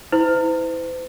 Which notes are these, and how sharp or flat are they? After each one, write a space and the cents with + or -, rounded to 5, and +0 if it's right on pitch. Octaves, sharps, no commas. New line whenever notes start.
E4 -20 C5 -45